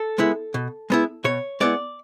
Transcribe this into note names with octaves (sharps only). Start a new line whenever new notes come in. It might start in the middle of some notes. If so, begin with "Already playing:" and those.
Already playing: A4
G#3 B3 E4
B2
G#3 B3 E4
B2 C#5
G#3 B3 E4 D5